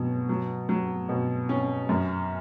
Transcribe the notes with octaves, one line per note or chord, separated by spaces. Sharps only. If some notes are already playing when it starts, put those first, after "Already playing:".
Already playing: B2 F#3
F#3
F#3
B2
C#4
F#2